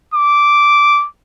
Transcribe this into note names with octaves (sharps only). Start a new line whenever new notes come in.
D6